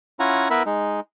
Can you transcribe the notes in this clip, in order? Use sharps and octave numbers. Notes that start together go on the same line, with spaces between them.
C#4 E4 F4 F#5 G#5 A#5
B3 E4 A#4 B4 E5 B5
G#3 D#4